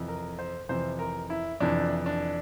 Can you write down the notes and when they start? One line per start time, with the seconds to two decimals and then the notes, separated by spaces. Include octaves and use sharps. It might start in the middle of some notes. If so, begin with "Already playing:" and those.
Already playing: F2 C3 E3
0.08 A#4
0.39 C5
0.69 F2 C3 E3 C5
0.99 A#4
1.30 E4
1.60 F2 C3 E3 D4
2.06 D4